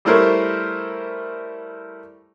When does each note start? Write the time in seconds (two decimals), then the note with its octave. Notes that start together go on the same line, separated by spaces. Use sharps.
0.05 G3 A3 E4 A#4 C5 C#5